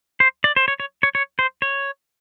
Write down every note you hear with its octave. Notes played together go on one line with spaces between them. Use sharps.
C5
D5
C5
C#5
C#5
C#5
C#5
C5
C#5